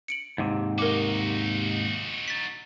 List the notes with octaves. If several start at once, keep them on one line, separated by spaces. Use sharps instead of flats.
C#7 D7 F#7
D#2 G#2 C3
D#4 F#4 A#4 D6
A6 B6